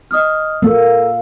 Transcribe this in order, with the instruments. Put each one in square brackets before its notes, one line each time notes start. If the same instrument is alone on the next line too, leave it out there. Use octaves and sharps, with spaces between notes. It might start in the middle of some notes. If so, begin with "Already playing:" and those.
[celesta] D#5 D#6 F6
[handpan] A#3 [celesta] A4 E6